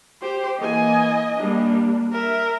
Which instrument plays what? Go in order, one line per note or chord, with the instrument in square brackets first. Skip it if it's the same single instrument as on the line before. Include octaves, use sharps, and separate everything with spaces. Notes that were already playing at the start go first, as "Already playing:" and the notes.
[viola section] G4 [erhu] C5
[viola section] E3 A#3 G#5 [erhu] D#5
[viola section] G3 A#3 D4
[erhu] A#4 [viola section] E5